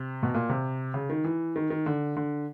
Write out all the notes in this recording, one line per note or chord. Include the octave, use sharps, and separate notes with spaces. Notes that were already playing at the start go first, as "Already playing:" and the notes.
Already playing: C3
B2
A#2
C3
C#3
D#3
E3
D#3
D#3
D3
D3